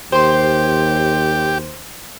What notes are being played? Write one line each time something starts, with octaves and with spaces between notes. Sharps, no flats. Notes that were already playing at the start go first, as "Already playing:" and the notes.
D#2 G4 C5 C6